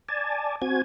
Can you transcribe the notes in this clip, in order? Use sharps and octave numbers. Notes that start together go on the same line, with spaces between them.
D5 G#5 A5
C4 F#4 G#5 G#6